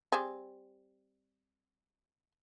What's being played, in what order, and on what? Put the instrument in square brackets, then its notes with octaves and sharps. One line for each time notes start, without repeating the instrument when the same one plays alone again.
[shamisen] G3 C4 G#4